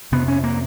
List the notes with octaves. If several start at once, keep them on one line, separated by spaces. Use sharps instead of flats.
F2 C3 B3
C#4
A#3